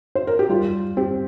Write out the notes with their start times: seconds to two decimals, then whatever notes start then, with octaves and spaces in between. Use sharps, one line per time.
0.15 C5
0.27 A#4
0.39 G4
0.50 G3 F4
0.97 C4 G4